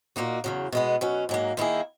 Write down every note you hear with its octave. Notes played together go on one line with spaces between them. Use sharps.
A#2 A#3 D#4 F#4
E2 C#3 F#3
B2 G#3 B3
B2 F#3 C#4
G#2 F#3 A#3
D#3 A#3 E4 G#4